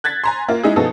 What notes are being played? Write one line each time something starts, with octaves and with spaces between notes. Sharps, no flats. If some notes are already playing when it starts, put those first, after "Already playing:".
F#6 G#6 A6 B6
G#5 A#5 C6
A#3 F4
G#3 D#4 E4 G#4
B2 F3 B3 D#4 G#4 A4